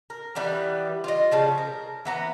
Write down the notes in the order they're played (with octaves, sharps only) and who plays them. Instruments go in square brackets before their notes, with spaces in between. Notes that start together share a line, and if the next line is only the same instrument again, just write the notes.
[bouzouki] A#4
E3 G3 B3 G4
F4 D#5
C#3 F3 G3
A#4
E3 B3 A#5